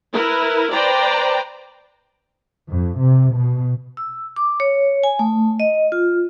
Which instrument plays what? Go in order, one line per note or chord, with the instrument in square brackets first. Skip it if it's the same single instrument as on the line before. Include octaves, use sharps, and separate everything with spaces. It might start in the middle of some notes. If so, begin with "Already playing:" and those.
[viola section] E4 A#4 B4
B4 C5 D5 G5 A#5
[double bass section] F2
C3
B2
[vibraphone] E6
D6
C#5
G#5
A3
D#5
F4